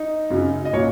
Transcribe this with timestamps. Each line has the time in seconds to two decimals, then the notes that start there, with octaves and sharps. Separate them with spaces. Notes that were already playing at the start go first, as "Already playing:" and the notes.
Already playing: D#4
0.30 F#2 C#3 F#3
0.65 D#5
0.73 A#2 F#3 C#5